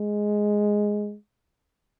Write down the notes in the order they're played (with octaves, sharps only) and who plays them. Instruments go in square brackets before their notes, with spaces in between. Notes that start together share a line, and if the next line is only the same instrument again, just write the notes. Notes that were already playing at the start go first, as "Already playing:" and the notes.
Already playing: [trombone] G#3